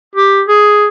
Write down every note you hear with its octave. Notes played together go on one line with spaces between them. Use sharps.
G4
G#4